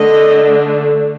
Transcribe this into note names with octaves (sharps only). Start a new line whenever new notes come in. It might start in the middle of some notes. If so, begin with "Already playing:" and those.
Already playing: D3 A3 D4 D#5